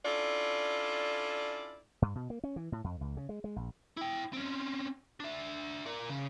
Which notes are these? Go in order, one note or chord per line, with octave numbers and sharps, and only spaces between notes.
C#4 D4 E4 F4 A4 D5
G2
B2
A#3
C#4
E3
A2
F2
C#2
C#3
G#3
G#3
A#1
E4 G5
C4 C#4
D4 E5
A#4 D5
C#3